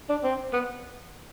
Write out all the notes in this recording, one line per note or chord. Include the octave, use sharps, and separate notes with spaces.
D4
C4
B3